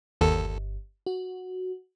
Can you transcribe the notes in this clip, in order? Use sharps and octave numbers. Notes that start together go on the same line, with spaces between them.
G1 D#2 A4
F#4